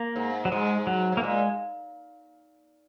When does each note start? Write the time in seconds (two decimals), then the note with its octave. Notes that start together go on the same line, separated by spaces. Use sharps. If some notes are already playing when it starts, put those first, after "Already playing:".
Already playing: A#3
0.16 G#2
0.45 F#3
0.52 G#2 G#3
0.87 F#3
1.12 G#2 A#3
1.23 A#2 G#3